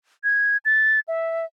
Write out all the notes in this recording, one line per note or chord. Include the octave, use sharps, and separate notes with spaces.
G#6
A6
E5